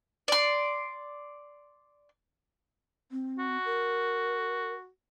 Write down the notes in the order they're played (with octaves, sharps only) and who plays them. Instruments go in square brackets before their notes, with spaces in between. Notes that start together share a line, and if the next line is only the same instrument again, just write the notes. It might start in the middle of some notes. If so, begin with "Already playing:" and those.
[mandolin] D5 C6
[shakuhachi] C4
[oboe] F#4
[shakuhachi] A#4